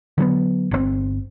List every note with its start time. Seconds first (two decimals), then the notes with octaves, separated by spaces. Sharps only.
0.18 D3 F#3 A#3 B3
0.71 G1 D3 C4